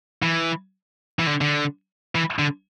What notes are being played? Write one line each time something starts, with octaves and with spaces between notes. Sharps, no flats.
E3
E3
D3
D3
E3
D3